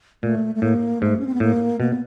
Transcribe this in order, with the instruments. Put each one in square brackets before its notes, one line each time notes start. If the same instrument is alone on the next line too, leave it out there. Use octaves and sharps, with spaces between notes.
[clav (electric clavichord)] A#2 [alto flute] A3
[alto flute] A3
[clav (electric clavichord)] A2 [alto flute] A#3
[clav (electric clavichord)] G#2 [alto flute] A3
[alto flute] C#4
C4
B3
[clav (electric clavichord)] A2 [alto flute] A#3
[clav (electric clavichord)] B2 [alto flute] A#3
[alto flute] B3